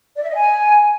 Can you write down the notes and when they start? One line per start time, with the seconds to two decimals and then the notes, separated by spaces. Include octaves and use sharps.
0.16 D5
0.22 E5
0.28 D#5
0.34 G#5